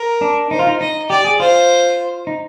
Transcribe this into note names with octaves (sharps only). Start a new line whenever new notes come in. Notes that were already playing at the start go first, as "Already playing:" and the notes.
Already playing: A#4
D4
D#4 C5
F4
D#4
D#4 D#5
G4 D5
G#4
F4 C5
D#4